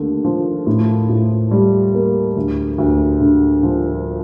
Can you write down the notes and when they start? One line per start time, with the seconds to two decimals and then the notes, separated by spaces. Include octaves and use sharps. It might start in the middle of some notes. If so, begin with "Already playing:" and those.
Already playing: D#2 D3 A3
0.25 F3
0.67 A2
1.09 A2
1.51 G3
1.94 A#3
2.37 D2
2.78 D2
3.20 D3
3.63 F3